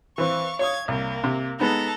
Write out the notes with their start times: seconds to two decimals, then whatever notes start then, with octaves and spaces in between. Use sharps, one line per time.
0.18 E3 C4 F5 C#6
0.59 C#5 F5 C#6 D#6 G#6
0.88 C2 A#3
1.24 C3
1.60 G#3 B3 D#4 A4 A#5